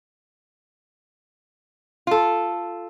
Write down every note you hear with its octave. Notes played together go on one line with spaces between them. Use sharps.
F4 A4